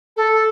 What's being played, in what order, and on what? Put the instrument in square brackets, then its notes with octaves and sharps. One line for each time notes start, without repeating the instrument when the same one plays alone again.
[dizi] A4